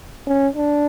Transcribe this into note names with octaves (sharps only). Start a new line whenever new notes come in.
C#4
D4